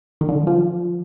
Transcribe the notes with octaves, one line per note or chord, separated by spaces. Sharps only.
D#3
D3
D#3
F#3
F3